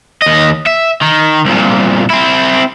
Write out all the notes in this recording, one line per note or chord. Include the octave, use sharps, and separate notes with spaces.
D#2 D#5
E5
D#3
C2 A#2
C4 E4